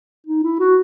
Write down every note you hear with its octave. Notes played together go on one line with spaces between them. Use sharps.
D#4
E4
F#4